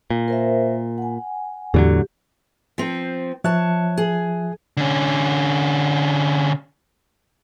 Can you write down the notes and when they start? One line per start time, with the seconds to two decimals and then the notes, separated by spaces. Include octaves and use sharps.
0.10 A#2
0.28 A#4 C5 E5
0.98 F#5 G#5
1.74 E2 A2 D3 F#3 G4
2.78 F3 C4
3.44 F3 C#5 E5 A5 F#6
3.97 G#4
4.77 D3 C#4